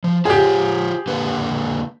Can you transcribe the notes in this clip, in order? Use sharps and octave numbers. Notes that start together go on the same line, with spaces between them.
F3
F4 G4 G#4 C5 C#5
D3 A#3 B4